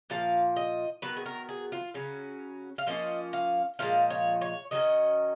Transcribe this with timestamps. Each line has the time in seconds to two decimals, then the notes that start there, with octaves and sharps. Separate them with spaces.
0.10 A#2 F3 F5
0.56 D#5
1.02 D#3 F#3 B3 B4
1.17 G#4
1.26 A#4
1.49 G#4
1.72 F4
1.94 C#3 F#3 C#4
2.78 F5
2.87 F3 A#3 C#4 D#5
3.33 F5
3.79 A#2 F3 G#3 F5
4.10 C#5
4.41 C#5
4.71 D#3 F#3 C#4 D#5